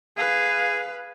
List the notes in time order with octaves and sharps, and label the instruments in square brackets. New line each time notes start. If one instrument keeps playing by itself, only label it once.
[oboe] G#4 [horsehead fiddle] B4 F5